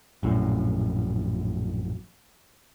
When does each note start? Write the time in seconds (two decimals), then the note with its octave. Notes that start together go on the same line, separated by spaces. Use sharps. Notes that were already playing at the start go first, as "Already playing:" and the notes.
0.23 A#1 F#2 A2